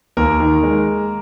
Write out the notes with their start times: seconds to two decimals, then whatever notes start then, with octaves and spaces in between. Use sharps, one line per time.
0.17 D#2 A#3 A#4
0.40 D#3
0.63 G#3